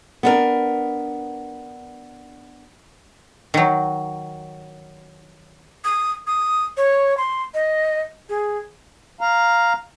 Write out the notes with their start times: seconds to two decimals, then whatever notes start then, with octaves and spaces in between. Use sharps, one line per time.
0.23 B3 D4 A#4
3.54 D#3 F#3
5.85 D#6
6.27 D#6
6.77 C#5
7.17 C6
7.54 D#5
8.29 G#4
9.21 F5 A#5